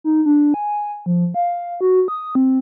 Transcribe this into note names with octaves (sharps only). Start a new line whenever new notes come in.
D#4
D4
G#5
F3
F5
F#4
D#6
C4